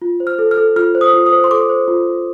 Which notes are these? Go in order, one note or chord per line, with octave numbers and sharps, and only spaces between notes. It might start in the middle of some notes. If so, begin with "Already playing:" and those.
F4
C5
F6
A4
F6
A4
F4 F6
C5
D#6
F4
D#6
C5
C6
A4 D6
C5
F4
F4